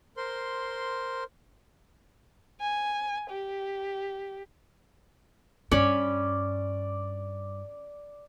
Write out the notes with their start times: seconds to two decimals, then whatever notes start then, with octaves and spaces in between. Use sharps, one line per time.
0.17 A#4 C5 C6
2.60 G#5
3.30 G4
5.71 G2 C#4 D5 B5